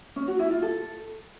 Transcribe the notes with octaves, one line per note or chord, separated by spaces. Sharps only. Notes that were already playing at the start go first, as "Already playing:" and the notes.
C#4
F#4
E4
F4
A4